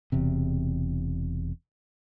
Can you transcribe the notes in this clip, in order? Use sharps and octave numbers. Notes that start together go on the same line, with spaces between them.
E1 E2 C3